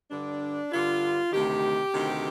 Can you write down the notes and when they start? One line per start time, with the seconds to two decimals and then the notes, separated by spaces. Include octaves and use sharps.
0.11 G2 D3 D4
0.72 G2 D3 F4
1.32 D2 C3 D#3 G4
1.92 D2 C3 D#3